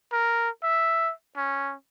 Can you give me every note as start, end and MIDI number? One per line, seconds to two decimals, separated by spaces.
0.12 0.50 70
0.63 1.13 76
1.36 1.74 61